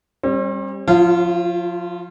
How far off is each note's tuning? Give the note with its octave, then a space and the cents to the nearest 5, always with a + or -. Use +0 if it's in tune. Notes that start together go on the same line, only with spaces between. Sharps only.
G3 +10 C4 +45
F3 +30 F4 -25 C#5 -40